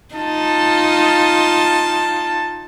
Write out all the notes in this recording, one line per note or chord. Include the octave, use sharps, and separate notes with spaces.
D#4 F4 A5